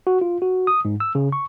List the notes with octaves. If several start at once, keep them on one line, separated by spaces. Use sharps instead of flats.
F#4
F4
F#4
D#6
G#2
E6
C#3
C#6